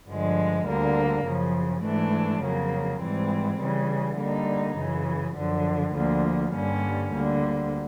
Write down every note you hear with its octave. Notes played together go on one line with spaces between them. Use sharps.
G2 D3 F3 G#3
D2 D3 G3 A#3
F#2 C#3 F3
G#2 E3 A3 D4
F2 C#3 F#3 A#3
G#2 E3 G3 C4
C#3 E3 G3
D3 G3 A#3 D#4
F#2 C#3 E3
F#2 D3 F3
D2 D3 F3 A#3
G2 D3 G3 A#3 C#4
D2 D3 G3 A#3